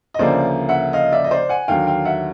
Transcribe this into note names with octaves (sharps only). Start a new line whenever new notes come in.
D#5
D2 C#3 F3 A#3 C5 D5
E5 F#5
D#5 F5
D5 E5
D#5
C5 D5
F#5 G#5
D#2 D3 F#3 F5 G5
F5 G5
E5 F#5